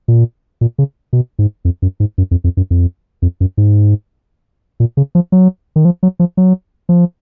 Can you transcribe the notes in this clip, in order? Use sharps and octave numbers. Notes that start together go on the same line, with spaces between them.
A#2
A#2
C#3
B2
G#2
F2
F#2
G#2
F#2
F2
F2
F#2
F2
F2
F#2
G#2
A#2
C#3
F3
F#3
D#3
F3
F#3
F3
F#3
F3